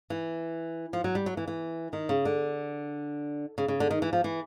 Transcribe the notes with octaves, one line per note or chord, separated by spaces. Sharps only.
E3
F3
F#3
G3
F#3
E3
E3
D#3
C#3
D3
C#3
C#3
D3
D#3
E3
F3
E3